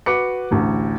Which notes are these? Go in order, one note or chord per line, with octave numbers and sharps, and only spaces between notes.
F#4 B4 D6 C#7
A1 D2